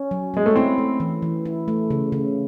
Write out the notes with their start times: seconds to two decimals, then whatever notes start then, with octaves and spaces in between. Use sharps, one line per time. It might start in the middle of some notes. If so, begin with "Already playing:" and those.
Already playing: C#4
0.11 F#3
0.34 F#3 G#3
0.46 A3
0.56 C4 E4
0.78 A3
1.00 E3
1.22 E3
1.45 E4
1.68 A3
1.90 C#3
2.12 C#3